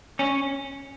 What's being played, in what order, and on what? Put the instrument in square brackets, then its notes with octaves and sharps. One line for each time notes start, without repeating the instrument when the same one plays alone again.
[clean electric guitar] C#4